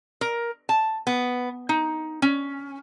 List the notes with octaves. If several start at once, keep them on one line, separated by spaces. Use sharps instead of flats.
A#4
A5
B3
D#4
C#4